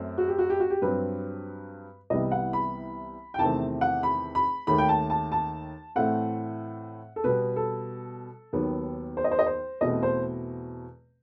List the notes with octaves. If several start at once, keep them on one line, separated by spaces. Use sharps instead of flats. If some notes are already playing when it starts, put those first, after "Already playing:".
Already playing: F#2 A3 C4
F#4
G4
F#4
G4
F#4
G4
G2 F#3 C4 B4
C2 C3 E3 G3 B3 D#5
F#5
B5
G5
E2 C3 D#3 A3 C4 A5
F#5
B5
B5
D#2 D#3 A3 B5
G5
A5
A5
A5
A2 E3 A3 C4 F#5
A4
B2 G3 B3 B4
A4
D#2 D#3 F#3 B3
C5
D#5
C5
D#5
C5
E2 B2 A3 C4 D#5
C5